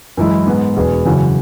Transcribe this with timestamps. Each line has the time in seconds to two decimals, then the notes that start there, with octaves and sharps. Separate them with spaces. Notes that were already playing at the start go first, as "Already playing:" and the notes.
0.17 F#2 E3 G#3 E4
0.47 G#2 G#3 B3
0.76 E1 E2 B2 B3 G#4
1.05 F#2 C#3 E3 C#4 F#4